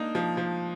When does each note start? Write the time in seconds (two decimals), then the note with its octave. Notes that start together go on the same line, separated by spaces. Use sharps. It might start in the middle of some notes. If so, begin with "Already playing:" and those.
Already playing: A#3 D4 D#4
0.15 F3
0.37 F3